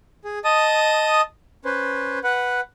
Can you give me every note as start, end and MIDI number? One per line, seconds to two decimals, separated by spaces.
0.24 0.39 68
0.44 1.21 75
0.44 1.21 81
0.44 1.21 87
1.65 2.19 61
1.65 2.19 71
1.65 2.19 72
2.24 2.61 71
2.24 2.61 78